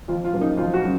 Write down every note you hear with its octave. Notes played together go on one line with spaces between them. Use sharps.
F2 F4
F4
C#3 F#3 A#3
D#4
F2 F4
F#4
C#3 F#3